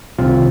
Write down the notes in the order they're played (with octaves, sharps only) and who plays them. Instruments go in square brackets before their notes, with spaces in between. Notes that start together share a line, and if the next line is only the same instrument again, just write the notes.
[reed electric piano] C2 C3 D#3 C4 F4